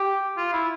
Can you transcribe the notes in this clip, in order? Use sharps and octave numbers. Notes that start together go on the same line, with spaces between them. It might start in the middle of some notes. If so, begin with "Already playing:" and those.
Already playing: G4
F4
E4